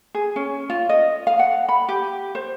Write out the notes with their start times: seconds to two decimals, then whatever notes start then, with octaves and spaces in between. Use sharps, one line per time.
0.15 G#4
0.36 C#4
0.70 F4
0.89 D#5
1.27 F5
1.39 F#5
1.69 B5
1.89 G4
2.35 C5